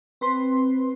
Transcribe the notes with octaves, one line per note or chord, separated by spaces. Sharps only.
C4 B4 C6